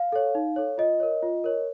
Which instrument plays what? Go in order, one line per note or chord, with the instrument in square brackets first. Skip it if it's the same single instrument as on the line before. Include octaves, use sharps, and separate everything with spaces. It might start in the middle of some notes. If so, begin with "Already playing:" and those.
Already playing: [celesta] F5
A4 C#5
D#4
A4 C#5
F4 D#5
A#4 C#5
F4
A#4 C#5